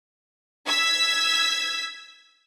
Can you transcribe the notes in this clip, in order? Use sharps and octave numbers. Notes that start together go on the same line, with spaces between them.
E6 G#6 B6